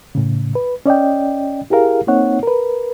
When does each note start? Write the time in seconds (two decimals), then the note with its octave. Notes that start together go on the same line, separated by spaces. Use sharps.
0.15 A2 C#3
0.55 B4
0.86 C#4 D5 D#5 G5
1.70 E4 G4 G#4 A#4 F5
2.07 A#3 C4 D#4 C#5 F#5
2.43 A#4 B4